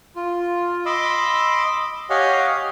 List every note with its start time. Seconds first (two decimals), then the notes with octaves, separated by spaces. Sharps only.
0.16 F4
0.86 D#5 B5 C6 D6 E6
2.10 G4 C#5 D#5 F5 F#5 G#5